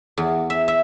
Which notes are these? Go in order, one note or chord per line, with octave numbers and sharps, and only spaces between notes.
E2
E5
E5